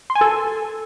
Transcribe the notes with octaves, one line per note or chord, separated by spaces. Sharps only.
C6
G#5
A4